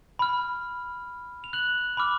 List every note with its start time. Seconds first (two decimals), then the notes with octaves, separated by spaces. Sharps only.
0.19 B5 F6
1.44 F7
1.53 F#6 F#7
1.97 B5 D6 F6